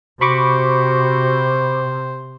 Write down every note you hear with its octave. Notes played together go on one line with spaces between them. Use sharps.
C3 F#4 C5 B5 C#6 D6